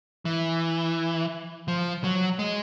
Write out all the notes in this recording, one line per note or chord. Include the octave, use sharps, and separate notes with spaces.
E3
F3
F#3
G#3